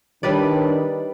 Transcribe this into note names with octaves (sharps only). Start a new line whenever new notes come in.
D#3 G3 D4 B4 D5